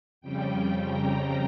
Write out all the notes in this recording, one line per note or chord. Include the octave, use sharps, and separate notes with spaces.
F2 C#3 G3 G5
A#5